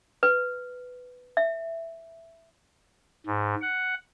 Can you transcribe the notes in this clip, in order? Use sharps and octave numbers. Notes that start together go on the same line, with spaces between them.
B4
E5
G#2
F#5